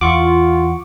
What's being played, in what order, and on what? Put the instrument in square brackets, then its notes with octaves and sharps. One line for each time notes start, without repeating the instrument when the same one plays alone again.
[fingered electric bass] E2 [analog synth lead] F4 [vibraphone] F#5 [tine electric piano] C#6 D6